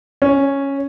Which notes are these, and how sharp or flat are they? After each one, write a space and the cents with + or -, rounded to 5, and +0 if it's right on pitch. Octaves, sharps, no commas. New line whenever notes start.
C#4 -5